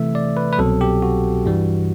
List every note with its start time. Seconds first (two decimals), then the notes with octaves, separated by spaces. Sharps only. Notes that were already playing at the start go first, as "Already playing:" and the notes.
Already playing: C3 E3 A3 E5
0.15 D5
0.37 B4
0.53 B4
0.58 C2 B2 F#3 C4 A4
0.81 G4
1.02 F#4
1.46 G2 E3 G3